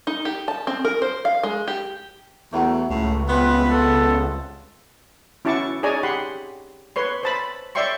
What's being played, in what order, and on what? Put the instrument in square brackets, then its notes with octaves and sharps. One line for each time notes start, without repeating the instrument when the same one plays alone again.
[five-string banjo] D#4
G4
A5
C4
A#4
C5
F5
G#3
G4
[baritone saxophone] E2 [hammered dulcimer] F#3 A3
[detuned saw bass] C#2 [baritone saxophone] A2
[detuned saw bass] C#2 [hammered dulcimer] G3 C4 F4 [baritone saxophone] B3 [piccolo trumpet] B4
[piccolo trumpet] A4
[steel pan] C#4 E4 F#4 A5 C#6 D6
D#4 G#4 C#5 D5 G#5 A#5
G4 F#5 B5 C6
B4 C#5 C6
C5 A5 B5
C#5 D5 E5 G5 C6 C#6